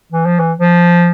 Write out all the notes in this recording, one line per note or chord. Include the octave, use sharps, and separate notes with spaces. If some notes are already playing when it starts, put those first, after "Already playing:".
E3
F3
E3
F3